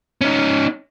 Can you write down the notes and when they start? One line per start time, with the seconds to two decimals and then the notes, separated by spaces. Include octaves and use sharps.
0.21 C#4 D#4